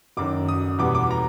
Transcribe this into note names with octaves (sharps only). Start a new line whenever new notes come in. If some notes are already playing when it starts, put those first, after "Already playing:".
F#1 F#2 D#3 D6
D#6
E2 B2 G3 B3 D6
D6
A#5